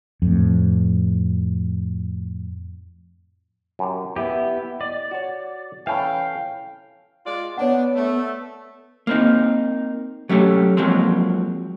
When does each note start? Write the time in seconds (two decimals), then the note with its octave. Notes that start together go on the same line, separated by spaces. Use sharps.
0.22 F2 A2
3.79 F#2 G4
4.16 B3 E4 G4 B4
4.81 D5 D#5
5.11 F#4 C#5
5.87 E3 C#4 A4 F5 G5
7.25 G#3 F4 D5
7.58 B3 D4 C#5 D5 F#5
7.95 A3
9.07 A#3 C4 D#4
10.29 F#3 A3 C#4 G4
10.77 F3 F#3 G#3 A#3 C4